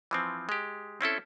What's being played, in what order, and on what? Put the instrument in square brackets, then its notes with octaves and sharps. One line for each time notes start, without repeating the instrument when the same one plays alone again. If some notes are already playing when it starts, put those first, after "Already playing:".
[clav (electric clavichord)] E3 F3 C4
G#3 G4
C4 C#4 E4 A4